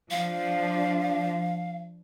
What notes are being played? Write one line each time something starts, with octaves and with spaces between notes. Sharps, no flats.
F3 D4 F5